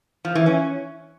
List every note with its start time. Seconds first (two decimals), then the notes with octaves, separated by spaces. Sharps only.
0.25 F3
0.35 E3
0.46 C#4